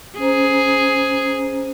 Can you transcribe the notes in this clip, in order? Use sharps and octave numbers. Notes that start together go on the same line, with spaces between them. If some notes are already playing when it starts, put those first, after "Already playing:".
C#4 G#4 C5 A#5